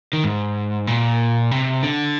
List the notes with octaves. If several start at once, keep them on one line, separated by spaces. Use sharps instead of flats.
D#3
G#2
A#2
C3
D3